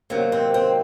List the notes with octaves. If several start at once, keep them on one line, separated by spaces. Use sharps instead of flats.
C3 D#3 F#3 A#3
C4
C4